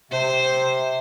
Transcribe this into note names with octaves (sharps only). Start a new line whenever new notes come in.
C3 C5